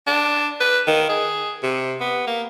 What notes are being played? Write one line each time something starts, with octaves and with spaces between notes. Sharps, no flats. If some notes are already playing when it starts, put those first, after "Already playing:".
D4
B4
D#3
G#4
C3
B3
A#3